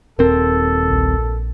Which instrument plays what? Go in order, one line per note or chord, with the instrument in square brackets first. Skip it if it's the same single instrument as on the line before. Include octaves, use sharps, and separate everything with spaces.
[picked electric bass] D#1 C4 [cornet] A4 [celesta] A#4
[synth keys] A#1